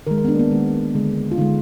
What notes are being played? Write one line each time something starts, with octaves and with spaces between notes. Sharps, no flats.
D#3 G#3 A#4
A#4
B3
D4
A#3
B3
D#3 G#3
D3 G#3
F4
D3 G#3 D#4